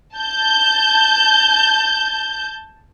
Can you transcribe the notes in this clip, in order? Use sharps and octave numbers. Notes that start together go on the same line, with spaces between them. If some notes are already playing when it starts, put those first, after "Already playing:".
A5 G6